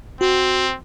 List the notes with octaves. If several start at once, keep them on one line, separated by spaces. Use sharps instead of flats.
C4 F#4